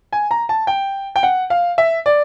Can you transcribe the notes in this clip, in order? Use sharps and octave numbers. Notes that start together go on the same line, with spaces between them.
G#5
A#5
A5
G5
G5
F#5
F5
E5
D5